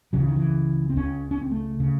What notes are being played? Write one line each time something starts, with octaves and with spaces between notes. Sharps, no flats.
C#2 C#3 F#3
E3
D#3
E3
C4
C#2 C#3 C#4
C#4
C4
A3
C#3